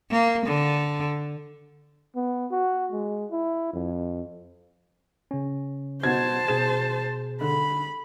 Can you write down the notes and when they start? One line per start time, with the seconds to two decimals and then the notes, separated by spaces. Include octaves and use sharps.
0.10 A#3
0.46 D3
2.16 B3
2.52 F#4
2.92 G#3
3.31 E4
3.73 F2
5.31 C#3 C#4
6.03 B2 F#4 C5 A5 G#6
6.48 B2 G#4 E7
7.41 D3 B5